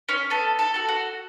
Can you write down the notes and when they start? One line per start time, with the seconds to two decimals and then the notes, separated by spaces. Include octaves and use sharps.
0.09 C#4 C#5
0.30 B3 A4 A5
0.59 A4 A5
0.74 F#4 A4
0.88 F#4 F#5